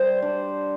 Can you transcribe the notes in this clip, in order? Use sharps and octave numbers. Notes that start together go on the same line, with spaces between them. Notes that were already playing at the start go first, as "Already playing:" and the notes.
Already playing: G3 C5
D4